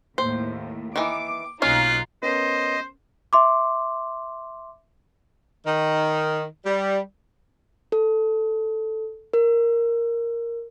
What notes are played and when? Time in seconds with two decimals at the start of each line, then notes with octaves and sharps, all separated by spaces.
0.18 D#2 A2 C5
0.96 D#3 E3 D6
1.62 B1 A#3 C#4 D#4 F4 F5 F#6
2.23 B3 C#4 A#4 C5 D#5
3.33 E5 C6 D6
5.66 D#3
6.65 G3
7.92 A4
9.34 A#4